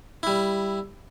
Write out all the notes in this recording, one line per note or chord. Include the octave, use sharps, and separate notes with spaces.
G3 E4